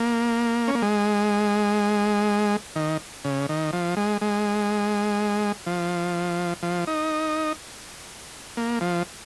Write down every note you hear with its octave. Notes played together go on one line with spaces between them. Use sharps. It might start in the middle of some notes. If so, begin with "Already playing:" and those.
Already playing: A#3
C#4
A#3
G#3
D#3
C#3
D#3
F3
G#3
G#3
F3
F3
D#4
A#3
F3